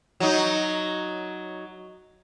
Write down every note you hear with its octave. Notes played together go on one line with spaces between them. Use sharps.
F#3 D#4